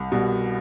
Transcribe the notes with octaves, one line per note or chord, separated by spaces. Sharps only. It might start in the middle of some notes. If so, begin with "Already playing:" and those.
Already playing: C2
B2 G3